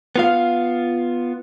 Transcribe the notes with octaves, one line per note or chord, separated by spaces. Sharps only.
B3 F4 F5